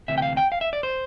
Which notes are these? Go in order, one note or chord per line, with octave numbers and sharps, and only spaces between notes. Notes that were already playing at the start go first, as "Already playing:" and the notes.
D2 C3 E3 E5
G5
F5
G5
F5
E5
D5
C5